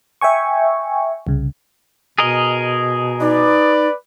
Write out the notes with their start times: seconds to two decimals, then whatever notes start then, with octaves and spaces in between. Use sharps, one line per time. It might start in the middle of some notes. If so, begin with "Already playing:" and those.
0.21 E5 G5 G#5 C#6
1.27 C2 C#3
2.18 B2 G#4 A#4 D#5
3.20 D#4 B4 D5